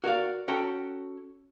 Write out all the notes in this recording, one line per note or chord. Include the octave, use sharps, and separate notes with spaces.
F#4 A#4 D5 F5
C#4 F#4 A4 G5 A#5